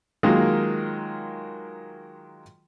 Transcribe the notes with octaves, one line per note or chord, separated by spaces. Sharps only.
D#3 F#3 G#3 A#3 F4